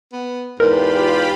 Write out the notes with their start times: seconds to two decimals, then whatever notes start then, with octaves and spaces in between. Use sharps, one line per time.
0.13 B3
0.60 E2 G#2 F4 G4 A#4 B5